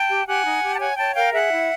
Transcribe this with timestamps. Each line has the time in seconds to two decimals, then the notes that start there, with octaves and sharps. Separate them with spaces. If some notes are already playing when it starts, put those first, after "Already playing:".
Already playing: G5 A5
0.09 G4
0.26 G4 F#5 G#5
0.44 D#4
0.62 G4
0.75 A5
0.79 C#5 F#5 G#5
0.97 C#5 G5 A5
1.15 A#4 F5 G5
1.32 G#4 E5 F#5
1.50 E4